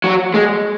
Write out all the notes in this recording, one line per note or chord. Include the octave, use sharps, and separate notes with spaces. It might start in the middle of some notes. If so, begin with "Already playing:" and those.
F#3
G#3